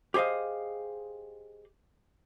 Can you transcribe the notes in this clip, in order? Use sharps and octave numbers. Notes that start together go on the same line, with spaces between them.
G4 G#4 C5 D#5 F5